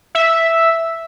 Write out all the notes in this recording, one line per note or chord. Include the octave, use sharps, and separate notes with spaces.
E5